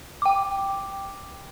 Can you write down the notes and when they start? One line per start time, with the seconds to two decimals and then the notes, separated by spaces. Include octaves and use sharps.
0.22 G5 D6